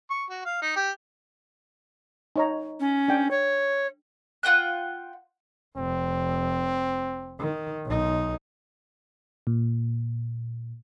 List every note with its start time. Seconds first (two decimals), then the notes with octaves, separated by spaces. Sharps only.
0.10 C#6
0.30 F#4
0.45 F5
0.62 D#4
0.76 G4
2.36 D#4 C#5 A#5
2.80 C#4
3.08 D4 G5
3.31 C#5
4.43 F4 F#5 G5 F#6
5.77 F1 C4
7.39 D#3
7.86 B1 D#4
9.47 A#2